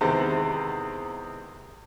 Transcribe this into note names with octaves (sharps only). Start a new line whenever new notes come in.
E2 C3 D#3 G#3